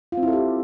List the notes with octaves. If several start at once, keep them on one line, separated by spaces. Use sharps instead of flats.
F4
C4
E4
A4
G4